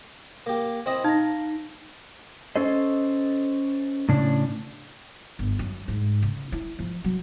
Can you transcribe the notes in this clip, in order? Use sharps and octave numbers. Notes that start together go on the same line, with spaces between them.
A#3 G4
C4 E4 D#5
D#4 F5 A#5
C#4 A4 C5 D#5
A2 C#3 C#4 D4
G1
F#2
G#2
C#3
E4
F3
F#3